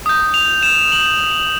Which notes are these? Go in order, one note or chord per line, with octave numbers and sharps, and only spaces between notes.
D#6 G6
F7
E7
F#7